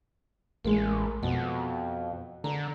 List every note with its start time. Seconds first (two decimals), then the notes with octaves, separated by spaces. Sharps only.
0.64 A1 G#3 A#3
1.23 F2 B2
2.44 D3 A#5